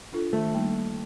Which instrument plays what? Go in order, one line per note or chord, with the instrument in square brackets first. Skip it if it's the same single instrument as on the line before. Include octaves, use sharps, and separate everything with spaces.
[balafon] D4 F4 A4
[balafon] D#3 [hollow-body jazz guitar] A3
[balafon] G3 A#3 D#4 A4
A#3